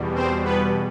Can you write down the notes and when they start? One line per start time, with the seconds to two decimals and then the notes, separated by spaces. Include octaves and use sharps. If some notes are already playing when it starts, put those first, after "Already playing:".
Already playing: E2 B2 G3
0.15 C4 C5
0.44 B3 B4